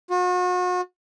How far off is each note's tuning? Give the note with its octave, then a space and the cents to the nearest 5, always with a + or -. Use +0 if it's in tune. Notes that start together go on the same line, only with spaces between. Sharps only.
F#4 -40